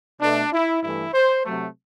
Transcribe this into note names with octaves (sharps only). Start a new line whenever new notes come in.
B2 A3 D4
E4
G2 E3 A3 E4
C5
C3 F#3 A3